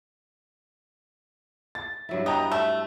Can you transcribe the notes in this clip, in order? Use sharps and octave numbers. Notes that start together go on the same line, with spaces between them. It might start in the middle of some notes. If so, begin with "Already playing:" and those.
A6
G2 F#3 E4
B3 D#5 G5 A#5
A3 E6